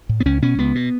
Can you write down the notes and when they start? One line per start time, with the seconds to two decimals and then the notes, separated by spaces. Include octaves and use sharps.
0.09 A2
0.20 B3
0.26 C#2 C#4
0.42 B2 C#4
0.58 C#2 B3
0.75 B2